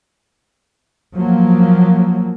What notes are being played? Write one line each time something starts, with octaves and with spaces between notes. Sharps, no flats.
F3 F#3 A#3